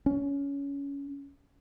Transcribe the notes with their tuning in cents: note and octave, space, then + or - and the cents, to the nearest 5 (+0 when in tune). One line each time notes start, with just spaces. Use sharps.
C#4 +20